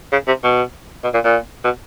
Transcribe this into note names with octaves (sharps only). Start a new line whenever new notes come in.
C#3
C3
B2
B2
A#2
A#2
B2